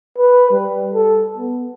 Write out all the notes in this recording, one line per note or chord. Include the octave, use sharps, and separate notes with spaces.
B4
G3
A4
B3